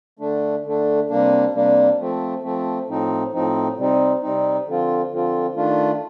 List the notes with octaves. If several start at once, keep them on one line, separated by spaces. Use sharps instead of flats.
D3 A3 D4
D3 A3 D4
C3 G3 A#3 D4
C3 G3 A#3 D4
F3 A3 C4
F3 A3 C4
A2 F3 C4 D#4
A2 F3 C4 D#4
C3 G3 C4 D#4
C3 G3 C4 D#4
D3 F3 C4 F4
D3 F3 C4 F4
D#3 A3 D4 F4